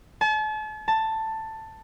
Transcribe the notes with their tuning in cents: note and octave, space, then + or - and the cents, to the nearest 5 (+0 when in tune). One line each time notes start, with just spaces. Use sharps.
A5 -40
A5 +10